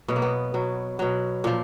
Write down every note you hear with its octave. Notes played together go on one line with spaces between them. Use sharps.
B2 F#3 B3
A#3
B3
B2 F#3
B2 F#3
A#2 F3